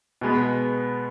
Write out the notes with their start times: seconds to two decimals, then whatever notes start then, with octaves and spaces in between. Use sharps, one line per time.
0.21 B2 G#3 B3